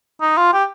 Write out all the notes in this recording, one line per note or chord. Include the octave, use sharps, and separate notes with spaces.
D#4
F4
G4